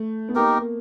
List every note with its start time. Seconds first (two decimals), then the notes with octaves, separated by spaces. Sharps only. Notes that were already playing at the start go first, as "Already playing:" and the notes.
Already playing: A3
0.29 B3
0.35 A#3 D#4 G4 A#4